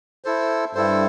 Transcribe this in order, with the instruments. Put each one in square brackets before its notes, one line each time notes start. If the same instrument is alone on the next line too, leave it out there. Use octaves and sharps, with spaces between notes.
[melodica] E4 A4 C5
[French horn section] G2 [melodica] E4 A4 C5